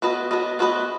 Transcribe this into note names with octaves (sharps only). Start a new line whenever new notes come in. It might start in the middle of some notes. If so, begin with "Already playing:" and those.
B3 F#4 B4 D#5
B3 F#4 B4 D#5
B3 F#4 B4 D#5